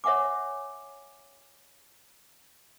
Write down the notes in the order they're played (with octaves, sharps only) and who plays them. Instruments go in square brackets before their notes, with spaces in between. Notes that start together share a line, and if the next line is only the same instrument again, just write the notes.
[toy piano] C#5 E5 F#5 G#5 D6